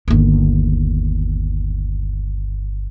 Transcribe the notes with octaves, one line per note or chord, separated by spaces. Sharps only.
G1 D#2